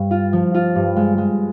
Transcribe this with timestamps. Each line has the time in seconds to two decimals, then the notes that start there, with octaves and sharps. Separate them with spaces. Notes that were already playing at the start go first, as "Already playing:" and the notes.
Already playing: G2
0.11 F4
0.33 F3
0.54 F4
0.75 G2
0.97 G#3
1.18 G#3